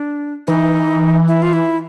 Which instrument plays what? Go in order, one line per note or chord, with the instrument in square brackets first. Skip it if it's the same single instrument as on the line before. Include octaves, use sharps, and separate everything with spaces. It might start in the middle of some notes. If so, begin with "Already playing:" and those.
Already playing: [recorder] D4
[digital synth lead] E3 [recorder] D#4
[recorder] E4
F4
E4